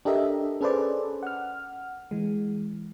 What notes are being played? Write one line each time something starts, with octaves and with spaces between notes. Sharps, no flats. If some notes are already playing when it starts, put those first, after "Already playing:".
D4 G4 A4 A#4 D#5 E5
C#4 G#4 A4 B4 C5 D5
F#5 F6
E3 G#3